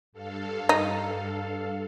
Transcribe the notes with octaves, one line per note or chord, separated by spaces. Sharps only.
G2 A4 F5
D#4